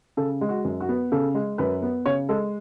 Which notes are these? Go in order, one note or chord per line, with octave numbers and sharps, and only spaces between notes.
C#3 A4
G#3
F#4
F#2
F#4
B3
C#3 A4
G#3
F#2 B4
B3
C#3 C#5
G#3 A4